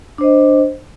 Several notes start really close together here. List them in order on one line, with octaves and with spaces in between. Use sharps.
D4 C5 D#5